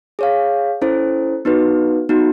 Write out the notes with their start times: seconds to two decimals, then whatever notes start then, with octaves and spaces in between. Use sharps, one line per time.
0.19 G#4 C#5 F5
0.82 C#4 E4 A4 C5
1.45 B3 D#4 F#4 B4
2.09 B3 D#4 F#4